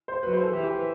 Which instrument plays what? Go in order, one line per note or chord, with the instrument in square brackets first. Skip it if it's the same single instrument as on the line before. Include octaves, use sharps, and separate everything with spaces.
[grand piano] C5
[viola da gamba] F#3 [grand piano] B4
[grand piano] C5
A4
[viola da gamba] E3 [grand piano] G4
[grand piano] G4
B4